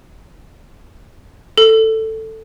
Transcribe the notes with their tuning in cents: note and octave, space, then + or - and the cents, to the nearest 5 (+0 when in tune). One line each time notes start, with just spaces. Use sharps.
A4 +10